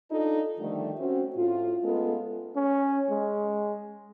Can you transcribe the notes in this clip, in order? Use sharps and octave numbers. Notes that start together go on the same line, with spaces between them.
D4 D#4 F4 A4
D3 D#3 F3 G3 A3
C4 C#4 F#4
A2 F4
G#3 A3 B3 C#4 F4 A4
C#4
G#3